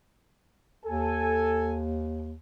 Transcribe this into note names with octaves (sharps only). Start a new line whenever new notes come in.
D#2 A4 G#5